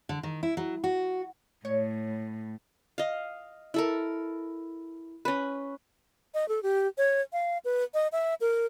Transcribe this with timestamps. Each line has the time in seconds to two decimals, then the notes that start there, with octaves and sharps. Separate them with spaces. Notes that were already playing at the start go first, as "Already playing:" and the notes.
0.09 D3
0.23 D#3
0.43 E4
0.57 F#3
0.84 F#4
1.65 A2 C#5
2.98 D#5 F5
3.74 E4 A4 A#4
5.25 C#4 B4
6.34 D#5
6.48 A4
6.63 G4
6.98 C#5
7.33 F5
7.65 B4
7.94 D#5
8.12 E5
8.41 A#4